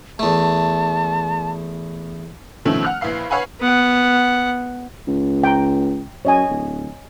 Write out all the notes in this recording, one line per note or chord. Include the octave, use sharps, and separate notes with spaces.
E2 A3 A5
B2 D#3 F3 A3 C4 C#4
F#5 F6 F#6
A#1 E4 B4 F5 C7
B4 C#5 F5 F#5 G#5 B5
B3 F#5
C#2
G5 A#5
F#2 C#5 D#5 G#5
D1